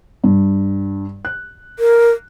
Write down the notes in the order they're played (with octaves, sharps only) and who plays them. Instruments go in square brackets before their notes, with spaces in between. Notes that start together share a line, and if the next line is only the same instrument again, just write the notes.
[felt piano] G2
F#6
[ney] A#4